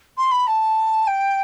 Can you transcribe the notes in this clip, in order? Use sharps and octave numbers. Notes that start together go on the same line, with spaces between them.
C6
B5
A5
G5